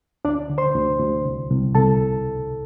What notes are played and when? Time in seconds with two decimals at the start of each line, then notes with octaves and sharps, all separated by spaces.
0.25 D2 D4 D5
0.50 D3
0.58 C5 C6
0.75 D2
1.00 D2
1.25 C2
1.50 C2
1.75 C2 A4 A5